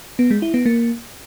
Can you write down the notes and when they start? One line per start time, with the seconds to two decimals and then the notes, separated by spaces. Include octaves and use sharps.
0.19 B3
0.31 G#3
0.42 E4
0.54 B3
0.66 A#3